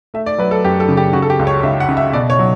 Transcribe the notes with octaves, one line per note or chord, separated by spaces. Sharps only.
A3 E5
D5
F#3 B4
A4
F#2 G4
A4
C#3
G4
C#3 F#4
A4
G4
C#2
C#5
C#2 E5
F#5
C#3
E5
B2 D5
C#5
F#3